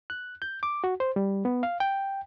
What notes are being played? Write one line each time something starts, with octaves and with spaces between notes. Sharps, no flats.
F#6
G6
D6
F#4
C5
G3
B3
F5
G5